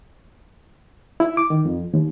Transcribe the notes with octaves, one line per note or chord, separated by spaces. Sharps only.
E4
D6
D#3
F2
D#2